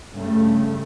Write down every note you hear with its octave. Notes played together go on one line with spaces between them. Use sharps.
G2 C#3 A3